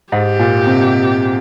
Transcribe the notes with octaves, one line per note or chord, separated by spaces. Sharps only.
G#2 G4
A#2
C3